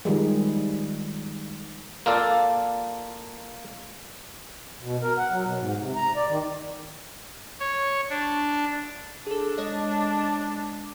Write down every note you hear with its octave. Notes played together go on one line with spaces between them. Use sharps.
D#3 F3 G3 G#3
A#3 F4 A4 D5
B2
A#4
F#5
F#3
B2
G#2
C3
A#5
D5
D#3
C#5
D4
D4 G#4 A4
G#3 C#5 D#5